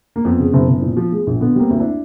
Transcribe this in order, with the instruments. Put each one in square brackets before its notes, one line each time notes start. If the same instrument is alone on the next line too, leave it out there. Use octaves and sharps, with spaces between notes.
[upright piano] A#3
F2 B3
C#3
F#1
F#1
A#2
F3
G#3
A#1
D3 B3
G3 A#3 C4
D2
D4 E4